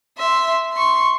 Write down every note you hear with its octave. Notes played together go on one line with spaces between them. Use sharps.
E5 C6
C6 C#6